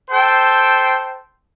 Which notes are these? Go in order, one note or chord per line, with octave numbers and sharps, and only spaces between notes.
A4 C5 G5